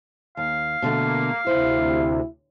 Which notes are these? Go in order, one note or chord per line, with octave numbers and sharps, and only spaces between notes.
D#2 F5
B2 D3 A3 A#3
D2 C3 E4 C5